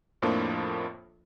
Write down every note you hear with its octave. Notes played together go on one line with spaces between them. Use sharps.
F2 A2 F3 A#3 D4 F4